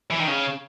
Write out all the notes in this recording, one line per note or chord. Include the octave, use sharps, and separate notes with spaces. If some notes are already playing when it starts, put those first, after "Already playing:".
E3
D#3
C#3